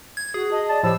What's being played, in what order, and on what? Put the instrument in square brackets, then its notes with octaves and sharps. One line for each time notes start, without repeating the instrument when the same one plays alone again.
[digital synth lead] G#6
[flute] F#4 [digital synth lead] G#4
[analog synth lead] D#5 [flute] A5
[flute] D5 [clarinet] A5
[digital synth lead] A2 [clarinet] F3 [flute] G4 [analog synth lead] E6